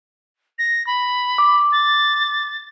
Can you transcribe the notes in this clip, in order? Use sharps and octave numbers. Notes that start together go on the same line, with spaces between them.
A#6
B5
D6
A6